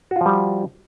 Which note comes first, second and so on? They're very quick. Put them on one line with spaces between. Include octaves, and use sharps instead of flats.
F#4 F4 F3 G3